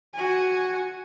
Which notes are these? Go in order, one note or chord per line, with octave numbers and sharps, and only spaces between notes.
F#4 G#5